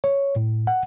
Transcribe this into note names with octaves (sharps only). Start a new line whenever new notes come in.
C#5
A2
F#5